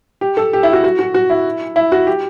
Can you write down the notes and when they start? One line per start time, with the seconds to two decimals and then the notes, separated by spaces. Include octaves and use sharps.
0.21 G4
0.37 A4
0.53 G4
0.63 E4
0.73 F#4
0.84 F#4
0.99 F#4
1.14 F#4
1.30 E4
1.76 E4
1.92 F#4
2.07 G4